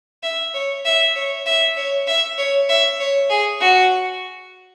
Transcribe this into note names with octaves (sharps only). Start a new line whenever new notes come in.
E5
C#5
E5
C#5
E5
C#5
E5
C#5
E5
C#5
G#4
F#4